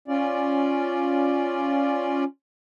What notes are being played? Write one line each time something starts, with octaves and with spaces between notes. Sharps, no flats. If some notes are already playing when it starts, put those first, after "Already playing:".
C#4 F4 D5